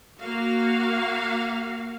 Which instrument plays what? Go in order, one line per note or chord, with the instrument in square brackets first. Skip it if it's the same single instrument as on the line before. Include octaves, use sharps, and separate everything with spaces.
[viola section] A#3 F#4 F5